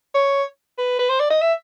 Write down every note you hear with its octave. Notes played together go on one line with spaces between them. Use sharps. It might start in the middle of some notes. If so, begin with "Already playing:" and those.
C#5
B4
B4
C5
D5
D#5
E5